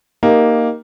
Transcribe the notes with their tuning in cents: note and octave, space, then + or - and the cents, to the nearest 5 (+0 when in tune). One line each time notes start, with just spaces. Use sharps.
A#3 +0 D#4 +0 G4 +0